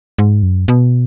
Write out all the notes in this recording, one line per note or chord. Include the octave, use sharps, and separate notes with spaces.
G#2
F#2
B2